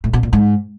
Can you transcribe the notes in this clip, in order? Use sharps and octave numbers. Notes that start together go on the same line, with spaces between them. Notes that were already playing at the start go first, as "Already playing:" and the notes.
A2
B2
A#2
G#2